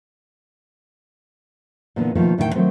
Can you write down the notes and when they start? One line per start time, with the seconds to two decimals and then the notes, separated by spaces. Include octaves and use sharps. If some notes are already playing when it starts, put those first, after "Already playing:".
1.96 A#2 D3 E3 A#3 B3
2.15 B2 D#3 F3 A3 A#3
2.38 D2 A2 D3 D#3 G#4 G5
2.55 D#3 F#3 A3 C4